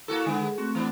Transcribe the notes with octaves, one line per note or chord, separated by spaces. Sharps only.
A#3 E4 F#4 A4
D3 G#3 B3 F#5
G#4
A3 C4 F#4
E3 B3 D4